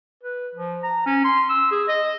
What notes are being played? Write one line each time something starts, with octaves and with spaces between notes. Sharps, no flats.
B4
F3
A#5
C#4
C6
E6
G#4
D#5